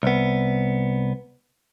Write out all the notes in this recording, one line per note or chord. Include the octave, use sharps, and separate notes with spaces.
C2 B3